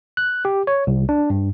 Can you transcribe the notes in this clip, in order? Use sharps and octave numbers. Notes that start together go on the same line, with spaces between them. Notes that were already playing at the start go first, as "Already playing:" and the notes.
F#6
G4
C#5
C2
D4
G2